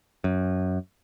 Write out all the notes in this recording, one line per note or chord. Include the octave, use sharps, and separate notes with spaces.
F#2